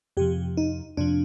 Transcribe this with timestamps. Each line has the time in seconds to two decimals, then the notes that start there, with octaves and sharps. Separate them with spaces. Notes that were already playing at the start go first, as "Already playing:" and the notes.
0.17 F2 C3 F3 G4
0.57 D#4
0.97 F2 C3 F3 D4